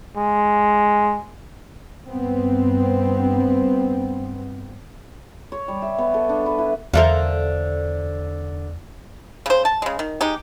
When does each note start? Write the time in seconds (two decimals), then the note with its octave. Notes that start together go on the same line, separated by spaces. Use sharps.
0.17 G#3
2.06 G2 B3 C4
5.52 C#5
5.68 G3
5.82 E5
5.98 B3
6.14 A4
6.29 D4
6.46 B4
6.58 E4
6.94 E2 D3 A4 A#4 C5 E5 F5
9.46 C#3 C5
9.65 A5
9.82 C#3 G#3
9.99 D#3
10.21 G#3 D#4 G4